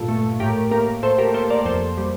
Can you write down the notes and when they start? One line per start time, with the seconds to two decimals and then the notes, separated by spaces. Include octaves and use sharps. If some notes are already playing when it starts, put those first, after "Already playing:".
Already playing: G2 A#2 F4 A4
0.08 A3
0.40 A2 G4 A#4
0.71 A#3 G4 A#4
1.03 A2 A4 C5
1.18 G4 A#4
1.34 A#3 A4 C5
1.50 A#4 D5
1.66 F2 A4 C5
1.97 G3